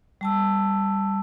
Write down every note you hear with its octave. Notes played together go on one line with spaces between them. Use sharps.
G3 A5 E6